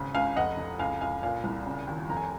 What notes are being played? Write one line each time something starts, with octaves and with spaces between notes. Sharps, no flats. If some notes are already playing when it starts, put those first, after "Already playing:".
Already playing: G#1 C#3
C#2 F5 G#5
F1 D#5 F#5
F1
C#2 F5 G#5
C#2 F5 G#5
A#2 F5 G#5
C2
C#3
D#2
F1 A#5
G#5